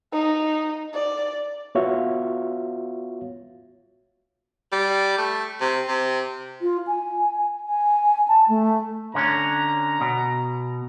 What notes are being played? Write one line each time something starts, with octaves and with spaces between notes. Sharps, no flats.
D#4
D5
B3 F4 F#4 C#5 E5 F5
G3
A3
C3
C3
F4
G#5
G#5
A5
A3
D3 C#4 A#5
B2